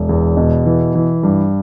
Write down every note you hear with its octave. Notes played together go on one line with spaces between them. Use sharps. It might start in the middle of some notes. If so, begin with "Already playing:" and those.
Already playing: E1
E2
B2
E3
E3
G2